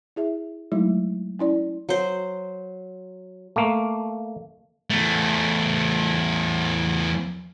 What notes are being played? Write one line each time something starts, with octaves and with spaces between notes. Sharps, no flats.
E4 G#4 E5
F#3 G#3 A3 D#4 E4
C#4 E4 D5
F#3 C5
A3 A#3
E2 A3